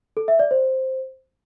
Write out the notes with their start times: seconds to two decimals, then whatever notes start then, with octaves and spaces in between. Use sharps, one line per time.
0.17 A4
0.28 E5
0.39 D5
0.51 C5